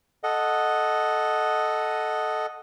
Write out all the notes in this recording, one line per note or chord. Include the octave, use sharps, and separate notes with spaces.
A4 D#5 F#5